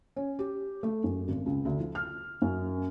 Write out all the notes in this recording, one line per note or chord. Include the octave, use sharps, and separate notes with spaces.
C#4
G4
A3
F#2
G#1
C#2
D2
F3
F6
F#2